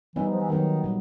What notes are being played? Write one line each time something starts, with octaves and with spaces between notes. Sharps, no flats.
E3 G3 B3 D#4
F3
E3
D#3 F#3 B3 D#4
A#2 G3